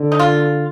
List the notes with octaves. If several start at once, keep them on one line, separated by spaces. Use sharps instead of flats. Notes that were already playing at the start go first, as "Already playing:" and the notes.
Already playing: D3
D#4
F4